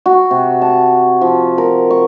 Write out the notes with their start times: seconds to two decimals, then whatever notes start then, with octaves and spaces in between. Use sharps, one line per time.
0.06 F#4
0.31 C3
0.62 A5
1.21 F3
1.58 A#4
1.90 C#6